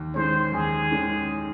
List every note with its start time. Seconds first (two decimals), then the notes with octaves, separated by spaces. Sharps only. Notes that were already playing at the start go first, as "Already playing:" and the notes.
Already playing: D#2
0.14 D#3 G#3 C#4 C5
0.53 D#2 G#4
0.92 D#3 G#3 C#4